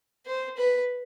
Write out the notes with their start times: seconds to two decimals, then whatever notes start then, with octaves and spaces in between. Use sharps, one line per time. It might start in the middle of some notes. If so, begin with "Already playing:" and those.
0.26 C5
0.57 B4